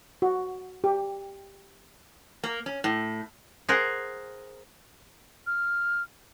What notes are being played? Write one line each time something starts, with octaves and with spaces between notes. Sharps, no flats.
F#4
G4
A#3
C#4
A2
G#4 A#4 C5 F#5
F6